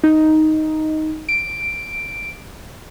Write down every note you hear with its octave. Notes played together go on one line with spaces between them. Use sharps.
D#4
D7